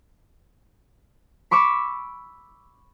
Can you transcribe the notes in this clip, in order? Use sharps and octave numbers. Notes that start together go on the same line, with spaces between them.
B5 C#6 D6 E6